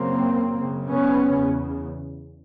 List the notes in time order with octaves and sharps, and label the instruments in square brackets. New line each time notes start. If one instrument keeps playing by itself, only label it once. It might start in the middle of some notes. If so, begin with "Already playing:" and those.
Already playing: [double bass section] F#2 C#3 A#3 C4
F#2 C#3
B3 C#4
E2 C#3